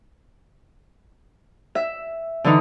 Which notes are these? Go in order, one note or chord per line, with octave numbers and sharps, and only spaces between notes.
E5
D3 E3 D#4